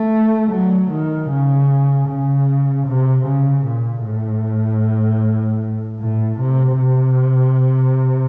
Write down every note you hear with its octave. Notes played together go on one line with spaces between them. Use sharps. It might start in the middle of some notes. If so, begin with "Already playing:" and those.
Already playing: A3
F#3
D#3
C#3
C#3
C3
C#3
A#2
A2
A2
C3
C3